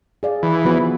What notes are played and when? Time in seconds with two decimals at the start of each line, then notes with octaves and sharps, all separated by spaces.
0.23 G#4 D5 F5
0.43 E3
0.65 F3 B3 F#4